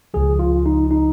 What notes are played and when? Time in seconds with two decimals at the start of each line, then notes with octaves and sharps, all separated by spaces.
0.14 C#2 C#3 F3 G#4
0.39 F4
0.66 D#4
0.91 D#4